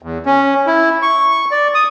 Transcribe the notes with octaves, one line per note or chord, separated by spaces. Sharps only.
E2
C#4
E4
C#6
D5
D#6